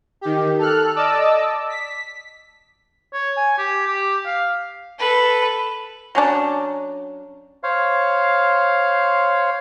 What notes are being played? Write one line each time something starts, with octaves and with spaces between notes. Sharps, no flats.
D#3 G4
A4 F6 F#6
D5 D#5 A5 D6 E6
B6
C#5
G#5
G4
G4
F5
A4 B4
F#3 C#4 D4
C5 C#5 F5